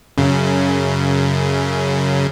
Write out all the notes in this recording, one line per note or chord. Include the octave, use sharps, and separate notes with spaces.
F#2 C#3